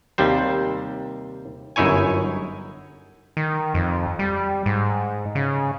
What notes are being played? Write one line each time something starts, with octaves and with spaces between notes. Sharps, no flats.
D#2 C3 G3 C5
G1 F#2 D#4 E4 C#5 G#5
D#3
F2
G3
G#2
C#3